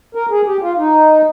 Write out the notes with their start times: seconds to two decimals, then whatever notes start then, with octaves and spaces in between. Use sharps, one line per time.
0.15 A#4
0.31 G#4
0.46 G4
0.62 F4
0.78 D#4